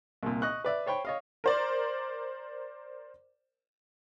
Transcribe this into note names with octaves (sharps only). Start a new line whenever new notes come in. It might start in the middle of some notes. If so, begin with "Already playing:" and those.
C2 A#2
D#5 C#6 F#6
B4 D5 E5
C5 C#5 G5 B5
C#5 D#5 F5
A#4 C5 D5